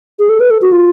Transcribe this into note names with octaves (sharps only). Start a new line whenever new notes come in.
G#4
A4
B4
A4
F#4
F4